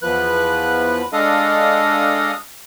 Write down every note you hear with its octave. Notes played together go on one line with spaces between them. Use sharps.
E2 F3 B4 F#6
G#3 D4 A4 D#5 F5 D#6